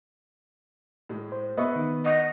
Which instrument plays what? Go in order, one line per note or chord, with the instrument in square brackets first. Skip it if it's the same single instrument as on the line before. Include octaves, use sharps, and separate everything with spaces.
[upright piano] A2 G#3
[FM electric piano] C5
[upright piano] B3 B4 [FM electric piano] D#5 E5 C#6
[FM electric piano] D#3
[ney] D#5 [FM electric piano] F#5 C#6 D#6